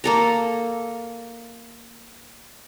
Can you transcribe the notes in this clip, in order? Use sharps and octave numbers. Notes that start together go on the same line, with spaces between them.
A#3 A4 A#5